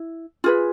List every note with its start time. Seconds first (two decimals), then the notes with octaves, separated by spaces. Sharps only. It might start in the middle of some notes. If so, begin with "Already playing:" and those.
Already playing: E4
0.44 F4 G#4 B4